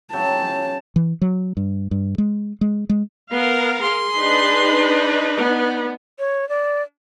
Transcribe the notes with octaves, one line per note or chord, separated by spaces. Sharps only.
C#3 F#3 G5 A5
E3
F#3
G2
G2
G#3
G#3
G#3
B3 A#4 F5
G#4 C6
D4 D#4 B4
B3
C#5
D5